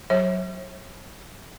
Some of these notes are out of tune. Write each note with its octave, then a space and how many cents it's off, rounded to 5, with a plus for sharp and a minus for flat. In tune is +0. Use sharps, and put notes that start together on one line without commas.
F#3 +0 C#5 -40